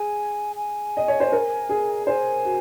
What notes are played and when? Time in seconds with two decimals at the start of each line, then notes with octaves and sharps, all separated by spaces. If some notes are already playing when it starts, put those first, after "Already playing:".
Already playing: G#4 G#5
0.56 G#5
0.97 D#5
1.08 C#5
1.20 C5
1.32 A#4
1.69 G#4
2.07 C5 G#5
2.45 F#4